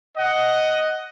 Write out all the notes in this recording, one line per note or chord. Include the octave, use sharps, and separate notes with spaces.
D#5 F#5